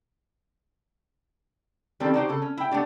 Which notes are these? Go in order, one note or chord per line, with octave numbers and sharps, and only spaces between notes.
D#3 G3 C4 C#4 A4
D#4 F#4 G4 C5
C#3 A4
C#4
E4 G5
A3 B3 D4 G4